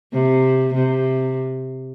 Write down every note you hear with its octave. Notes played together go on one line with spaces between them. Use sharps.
C3
C3